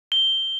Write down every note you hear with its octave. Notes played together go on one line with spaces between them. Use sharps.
G7